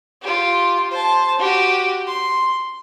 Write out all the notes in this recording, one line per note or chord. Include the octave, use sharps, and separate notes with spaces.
F4 G4
C5 A5
F#4 G4
C6